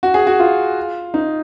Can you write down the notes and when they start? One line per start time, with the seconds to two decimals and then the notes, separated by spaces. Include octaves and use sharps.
0.03 F#4
0.14 G#4
0.27 F#4
0.40 F4
1.14 D#4